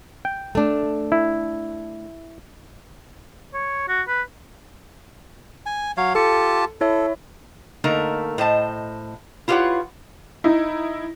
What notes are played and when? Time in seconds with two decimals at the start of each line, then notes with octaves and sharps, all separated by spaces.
0.25 G5
0.55 A3 D4
1.12 E4
3.53 C#5
3.88 F#4
4.08 B4
5.66 G#5
5.97 F#3 C#5 F5
6.15 F4 G4 A4 A5 C#7
6.81 E4 A4 C#5 E5
7.84 D3 A3 A#3 D#4 A#4
8.38 A2 C5 D#5 A5
9.48 E4 F4 G4 B4 C#5 F#5
10.44 D#4 E4